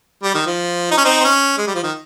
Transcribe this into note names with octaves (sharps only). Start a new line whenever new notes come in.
G3
D#3
F3
D#4
C#4
C4 D#4
C4
C#4
G#3
G3
F3
D#3